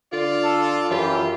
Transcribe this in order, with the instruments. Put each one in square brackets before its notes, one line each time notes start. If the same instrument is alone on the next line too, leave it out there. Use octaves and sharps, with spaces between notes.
[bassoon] D3 [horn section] F4 D5
[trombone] A4
[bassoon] F#2 [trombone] E3 [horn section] F4 G4